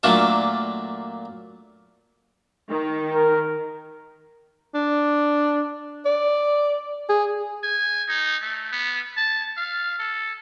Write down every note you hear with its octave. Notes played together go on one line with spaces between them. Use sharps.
A#2 F#3 A3 A#3 D4 A4
D#3
A#4
D4
D5
G#4
G#5
D#4
A3
B3
A5
F5
A4